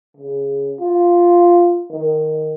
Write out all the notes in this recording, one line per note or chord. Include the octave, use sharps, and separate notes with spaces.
C#3
F4
D#3